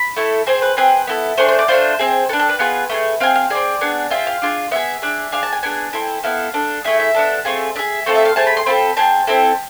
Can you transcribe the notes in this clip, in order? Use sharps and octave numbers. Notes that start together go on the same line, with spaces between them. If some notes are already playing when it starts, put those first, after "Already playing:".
Already playing: B5
A3 E4 A4
C4 G#4 C5
B4
C4 G#4 B4
B3 E4 A4
A3 D4 G#4 C5
C5
D5
A3 D4 F4 C5
C4 G#4
D4 A4 B4
A4
B4
B3 F4 G#4
A3 D4 G#4
C4 G#4 F5
F5
C4 G#4 D5
B3 D4 G#4
C4 F4 G#4 E5
F5
D4 F4 G#4
B3 F4 G#4 E5
D4 G#4
D4 G#4 F5
A5
G#5
B3 D4 G#4 G#5
C4 E4 A4
B3 E4 A4 F5
D4 A4
A3 E4 G#4 E5
E5
B3 D4 A4
A3 C4 F4 G#4
D4 G#4 E5
A3 C4 F4 A4
E5
F5
A3 C4 G#4 A5
B5
C6
C4 F4 A4 B5
C4 G#4 A5
C4 E4 A4